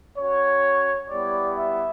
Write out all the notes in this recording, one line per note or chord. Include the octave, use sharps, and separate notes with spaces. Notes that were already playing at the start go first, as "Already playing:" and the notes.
C#4 F#4 C#5
G3 B3 E4 G4 D5
E5